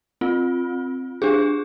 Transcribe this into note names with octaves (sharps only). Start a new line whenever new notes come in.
C4 F4
D4 G4 G#4